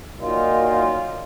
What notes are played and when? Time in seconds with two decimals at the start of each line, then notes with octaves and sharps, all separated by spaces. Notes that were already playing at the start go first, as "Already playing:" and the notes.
0.18 A#2 F#3 A#3 D#4 F4
0.62 F4